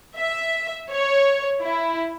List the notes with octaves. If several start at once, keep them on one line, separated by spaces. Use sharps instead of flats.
E5
C#5
E4